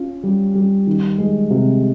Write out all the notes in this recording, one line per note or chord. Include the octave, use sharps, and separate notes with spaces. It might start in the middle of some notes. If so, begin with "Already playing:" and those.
Already playing: C#4 F4
G3
G3
D#3
G#3
C3